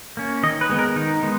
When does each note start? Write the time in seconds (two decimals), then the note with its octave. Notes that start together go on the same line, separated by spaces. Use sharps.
0.17 A#3 C#4
0.43 D#3 D#5
0.61 B4
0.70 G#3 B3
0.79 A#4
0.96 D#3 D#4
1.23 G#3 B3